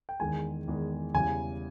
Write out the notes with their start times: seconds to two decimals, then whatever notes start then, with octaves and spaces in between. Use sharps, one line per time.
0.09 G5
0.20 E2 D#3 G#3 G#5
0.68 E2 D#3 G#3
1.14 E2 C#3 E3 G3 G#5